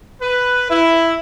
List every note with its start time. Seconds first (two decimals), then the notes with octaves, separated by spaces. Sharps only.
0.22 B4
0.71 E4